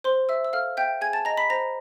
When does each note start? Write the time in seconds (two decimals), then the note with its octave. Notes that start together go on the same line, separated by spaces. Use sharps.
0.04 C5 C6
0.29 E5 E6
0.45 E6
0.53 A4 F5 F6
0.77 E5 G5 G6
1.01 G#4 G#5 G#6
1.13 A5 A6
1.25 D#5 A#5 A#6
1.37 B5 B6
1.50 C5 A#5 A#6